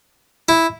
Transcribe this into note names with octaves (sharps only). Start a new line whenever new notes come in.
E4